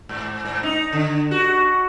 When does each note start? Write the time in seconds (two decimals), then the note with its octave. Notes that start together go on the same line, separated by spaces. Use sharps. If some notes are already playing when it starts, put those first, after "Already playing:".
0.09 G#2
0.45 G#2
0.63 D#4
0.93 D3
1.31 F#4